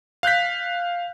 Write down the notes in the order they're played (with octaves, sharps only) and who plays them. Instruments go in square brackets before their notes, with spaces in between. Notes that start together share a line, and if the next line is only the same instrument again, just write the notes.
[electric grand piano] F5 F#6 G6 B6